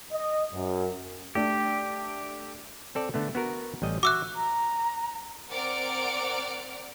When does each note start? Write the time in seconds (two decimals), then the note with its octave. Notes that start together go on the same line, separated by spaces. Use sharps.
0.12 D#5
0.53 F#2
1.35 A3 D4 G4
2.95 C4 A4 D5
3.14 D3 A3 B3
3.35 B3 F#4 A#4
3.82 A1 G3 D#5
4.03 F#4 E5 D6 E6 F#6
4.36 A#5
5.49 C4 A#4 D5 F#5 F6 D7